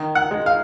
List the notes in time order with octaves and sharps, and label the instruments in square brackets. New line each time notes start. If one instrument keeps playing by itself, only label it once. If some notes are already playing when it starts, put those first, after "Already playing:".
Already playing: [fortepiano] D#3
F#5
G#3
F5